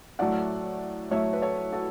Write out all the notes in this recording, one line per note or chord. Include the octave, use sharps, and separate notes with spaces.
A2 F#3 A3 D5 F#5
A2 F#3 A3 C#5 E5
B4
A4 C#5
F#4 A4